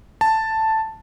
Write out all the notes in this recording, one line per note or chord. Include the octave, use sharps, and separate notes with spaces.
A5